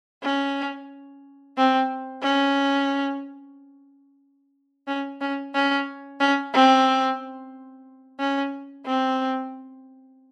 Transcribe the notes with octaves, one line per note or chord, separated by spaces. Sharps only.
C#4
C4
C#4
C#4
C#4
C#4
C#4
C4
C#4
C4